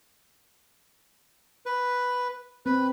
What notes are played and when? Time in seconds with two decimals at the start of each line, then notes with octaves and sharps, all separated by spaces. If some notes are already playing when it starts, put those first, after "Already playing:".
1.66 B4
2.66 C4 B4